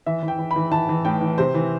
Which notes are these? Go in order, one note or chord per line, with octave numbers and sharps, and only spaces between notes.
E3 E5
E3
G5
E3
B5
E3
E3 A5
E3
A2 G5
E3
C3 C5
E3